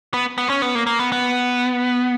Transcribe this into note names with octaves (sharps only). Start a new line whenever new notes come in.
B3
B3
C#4
B3
A#3
A#3
B3
B3